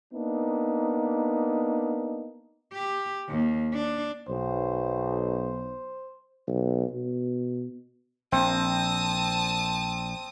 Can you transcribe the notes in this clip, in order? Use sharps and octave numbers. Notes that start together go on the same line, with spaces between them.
A#3 B3 D4 D#4
G4
D#2
D4
B1 C5
B1
B2
A#1 C4 A5 D#6